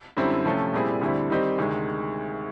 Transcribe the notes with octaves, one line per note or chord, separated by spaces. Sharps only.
F#2 D3 G3 C4 E4
C3 F3 A3 C#4
A#2 G3 C4 E4 G#4
D2 D3 G3 C4 E4
D#3 G3 C4 D#4 G4
D2 C3 D#3 G#3